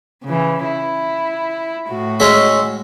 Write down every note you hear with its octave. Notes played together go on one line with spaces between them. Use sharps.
C#3 E3
E4
A2 F#4
G#3 C#4 E5